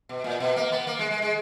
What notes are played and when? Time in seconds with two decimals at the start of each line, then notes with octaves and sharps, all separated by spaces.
0.09 B2
0.24 A#2
0.40 B2
0.56 A#3
0.72 B3
0.87 A#3
0.99 G#3
1.11 G#3
1.22 G#3